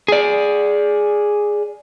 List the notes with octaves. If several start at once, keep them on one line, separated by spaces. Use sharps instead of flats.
G#4 D5